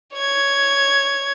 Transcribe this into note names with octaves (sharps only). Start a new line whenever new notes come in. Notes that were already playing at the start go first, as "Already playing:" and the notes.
C#5 G#6